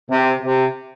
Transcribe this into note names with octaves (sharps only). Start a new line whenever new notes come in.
C3
C3